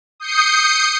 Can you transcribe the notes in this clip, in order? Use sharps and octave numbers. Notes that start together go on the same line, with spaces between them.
D#6 G6 C7 C#7